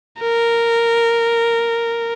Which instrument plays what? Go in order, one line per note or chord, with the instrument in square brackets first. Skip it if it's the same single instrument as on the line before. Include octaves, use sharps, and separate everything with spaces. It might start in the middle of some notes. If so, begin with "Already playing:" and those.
[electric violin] A#4